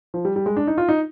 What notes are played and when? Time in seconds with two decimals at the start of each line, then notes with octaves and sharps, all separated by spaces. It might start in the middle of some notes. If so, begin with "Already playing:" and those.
0.14 F3
0.25 G3
0.36 G3
0.46 G#3
0.57 D4
0.67 D#4
0.78 F4
0.89 D#4